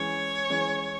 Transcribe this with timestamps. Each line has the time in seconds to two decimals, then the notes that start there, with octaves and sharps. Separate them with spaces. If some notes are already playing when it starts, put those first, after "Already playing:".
Already playing: E3 G#3 C#4 C#5
0.50 E3 G#3 C#4